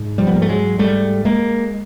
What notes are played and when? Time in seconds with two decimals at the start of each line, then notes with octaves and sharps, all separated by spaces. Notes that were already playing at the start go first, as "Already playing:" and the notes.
Already playing: G#2
0.18 F3 G3
0.27 B3
0.34 G#2 A#3
0.42 A3
0.49 F#3 G#3
0.79 G#2 G3 A3
1.25 G#3 A#3